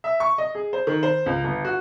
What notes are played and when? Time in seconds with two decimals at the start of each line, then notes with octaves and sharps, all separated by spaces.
0.04 E5
0.20 C#6
0.38 D#5
0.55 G#4
0.73 C5
0.87 D#3
1.03 C5
1.26 C#2
1.44 G1
1.65 F#4